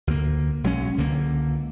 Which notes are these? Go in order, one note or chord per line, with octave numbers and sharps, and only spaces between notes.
D2 A#3
B1 F#3 G#3 C#4
C#2 D3 A#3